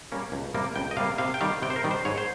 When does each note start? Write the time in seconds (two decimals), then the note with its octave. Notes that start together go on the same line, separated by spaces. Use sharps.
0.12 G3 A#3 C#4
0.32 C#2
0.54 C3 G3 A#3
0.76 C#2 G5
0.91 D#5
0.97 C3 G3 A#3 F5
1.18 C3 F5
1.34 G5
1.41 D#3 G3 F5
1.62 C3 G5
1.70 C5
1.76 A#4
1.84 D#3 G3
1.91 C5
2.05 G#2 C#5
2.18 C5